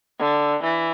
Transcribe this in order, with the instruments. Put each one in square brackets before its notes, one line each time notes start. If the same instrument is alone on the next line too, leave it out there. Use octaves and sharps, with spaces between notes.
[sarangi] D3
E3